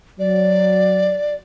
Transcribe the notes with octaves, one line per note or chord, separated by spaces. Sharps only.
F#3 D5